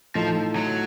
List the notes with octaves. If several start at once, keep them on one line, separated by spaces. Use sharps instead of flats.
A2 F3 A3 D#4 A4
F#3